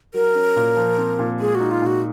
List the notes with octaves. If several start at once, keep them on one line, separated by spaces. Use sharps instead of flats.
F#3 A#4
C#4
A#2
F3
C4
A#2
G#3 G#4
F#4
D#4
F4
A#2 F#4